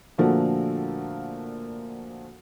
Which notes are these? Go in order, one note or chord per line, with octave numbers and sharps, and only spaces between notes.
A#2 D3 F3 A3 A#3 F#4